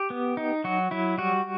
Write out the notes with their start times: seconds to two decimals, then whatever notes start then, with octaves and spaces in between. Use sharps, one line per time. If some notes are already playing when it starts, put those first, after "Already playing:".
Already playing: G4
0.10 B3
0.37 D#4
0.64 F#3 F#4
0.91 F#3 E4
1.18 G3 F#4